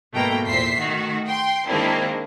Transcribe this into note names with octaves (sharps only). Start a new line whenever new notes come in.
G#2 B2 A3 A#3 G5 A#5
E2 A#2 C5 E5 B6 C7
D#3 A3 F#4
G5 C6
D#3 G#3 A#3 C4 D4 E4